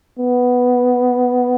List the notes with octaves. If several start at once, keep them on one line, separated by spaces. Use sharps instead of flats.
B3